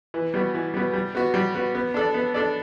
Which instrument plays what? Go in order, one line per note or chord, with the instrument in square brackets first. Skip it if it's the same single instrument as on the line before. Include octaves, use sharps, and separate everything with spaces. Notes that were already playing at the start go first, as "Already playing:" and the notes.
[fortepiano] E3
G3 B3 F#4
E3
G3 B3 F#4
G3
B3 F#4
G3
B3 F#4
B3
D4 A4 D5
B3
D4 A4 D5